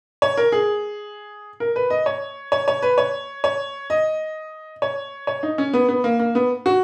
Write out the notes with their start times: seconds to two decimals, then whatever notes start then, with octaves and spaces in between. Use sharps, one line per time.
0.22 C#5
0.37 A#4
0.52 G#4
1.60 A#4
1.76 B4
1.90 D#5
2.06 C#5
2.52 C#5
2.68 C#5
2.82 B4
2.98 C#5
3.44 C#5
3.90 D#5
4.82 C#5
5.27 C#5
5.43 D#4
5.58 C#4
5.74 B3
5.89 B3
6.04 A#3
6.19 A#3
6.35 B3
6.66 F#4